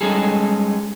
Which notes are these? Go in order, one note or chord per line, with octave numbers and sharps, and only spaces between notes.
G3 G#3 C#4 D#4 G#4 A4